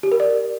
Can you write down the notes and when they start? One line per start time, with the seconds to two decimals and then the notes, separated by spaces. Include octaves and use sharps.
0.03 G4
0.12 A#4
0.20 D5